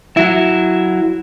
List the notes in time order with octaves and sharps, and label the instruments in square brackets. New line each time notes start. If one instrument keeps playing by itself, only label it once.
[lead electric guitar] F#3 E4